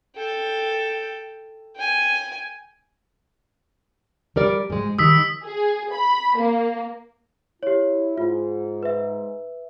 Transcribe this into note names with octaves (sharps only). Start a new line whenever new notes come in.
A4 G5
G5 G#5
G3 A#4 D5
G#2 G#3
D#3 G3 D#6 E6 B6
G#4
B5
A#3
E4 G4 C#5
G#2 F4
B4 E5